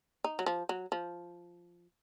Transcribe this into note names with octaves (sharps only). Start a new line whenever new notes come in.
D#4
F#3
F3
F#3
F3